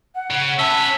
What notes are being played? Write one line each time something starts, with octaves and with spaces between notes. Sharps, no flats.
F#5
C#3
C#4 B4 E5 A5